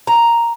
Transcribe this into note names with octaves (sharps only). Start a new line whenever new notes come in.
A#5